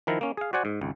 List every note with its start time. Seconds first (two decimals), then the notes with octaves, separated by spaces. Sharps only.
0.07 D#3 F3 E4 A#4
0.21 A#3 C#4
0.37 G#4 F5
0.53 F#4 C5 D5 F#5 G#5
0.65 G#2
0.81 G#1 C#2